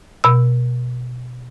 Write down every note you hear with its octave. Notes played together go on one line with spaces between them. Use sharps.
B2 E6